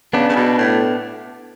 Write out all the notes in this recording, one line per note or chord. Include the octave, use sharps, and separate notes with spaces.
C#3 B3 D4
C#3
B2
A2